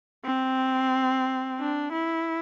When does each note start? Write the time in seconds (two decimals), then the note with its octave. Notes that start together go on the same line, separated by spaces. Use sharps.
0.25 C4
1.59 D4
1.92 E4